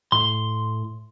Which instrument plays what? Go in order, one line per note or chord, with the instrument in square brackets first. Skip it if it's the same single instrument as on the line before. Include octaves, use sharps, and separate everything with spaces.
[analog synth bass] A2 [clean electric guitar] C6